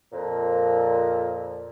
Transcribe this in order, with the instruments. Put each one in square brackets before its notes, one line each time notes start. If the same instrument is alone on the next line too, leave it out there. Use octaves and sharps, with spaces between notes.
[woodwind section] F2 A#2